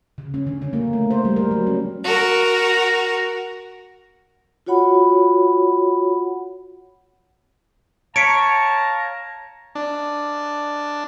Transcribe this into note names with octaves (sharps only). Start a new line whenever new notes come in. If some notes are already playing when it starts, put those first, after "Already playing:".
C#3
C#4
D3
C#4
A#3
A3
C5
G3
A#4
F#3
C#4
F#4 A#4
F4 F#4 C#5 F#5 B5
C#5 F5 A5 A#5 B6 C#7 D7
D4